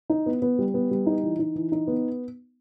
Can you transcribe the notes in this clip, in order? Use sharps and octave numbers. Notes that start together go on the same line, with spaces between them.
D#4
B3
B3
G3
B3
G3
D#4
E3
D#4
E3
D#4
B3